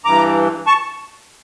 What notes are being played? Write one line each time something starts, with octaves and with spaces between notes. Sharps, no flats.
G2 E3 A#5 D6
A5 C#6